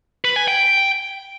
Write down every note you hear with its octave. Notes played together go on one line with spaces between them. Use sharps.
B4
G#5
G5